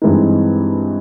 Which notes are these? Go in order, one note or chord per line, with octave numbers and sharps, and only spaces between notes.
G2 E3 G#3 C4 D#4